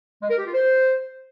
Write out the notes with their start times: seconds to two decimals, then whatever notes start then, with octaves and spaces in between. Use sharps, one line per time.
0.22 G#3
0.30 A#4
0.38 G4
0.46 F4
0.54 C5